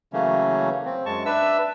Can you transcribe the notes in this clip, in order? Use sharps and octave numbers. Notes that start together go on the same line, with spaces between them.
C#3 E3 F#3 A3 A#3 C#4
C4
F#2 G#3 A5 C#6
D4 B4 E5 E6